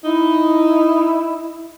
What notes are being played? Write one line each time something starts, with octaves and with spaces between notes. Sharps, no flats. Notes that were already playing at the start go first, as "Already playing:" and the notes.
D#4 E4